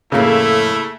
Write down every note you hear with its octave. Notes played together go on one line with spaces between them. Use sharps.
F2 A2 C#3 A3 A#3 E4